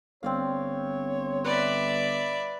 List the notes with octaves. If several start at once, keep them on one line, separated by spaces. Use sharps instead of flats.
G1 C4 C#5 D5 F5
B4 D5 E5